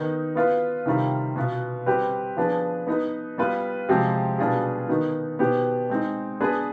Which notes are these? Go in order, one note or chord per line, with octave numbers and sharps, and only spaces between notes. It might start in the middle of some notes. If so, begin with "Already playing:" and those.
Already playing: D#3 B3 D#4
B3 F4 B4
C3 D#3 G3 C4 F4
B2 B3 F4
G3 C4 G4 B4
F3 B3 D4 G#4 B4
B3 D#4 B4
G3 B3 F4 B4
C3 F3 G#3 C4 G4
B2 G3 D4 F4 G#4
D#3 B3 D#4
B2 B3 D#4 G4 C5
G#3 C4 D#4
B3 D4 G#4 B4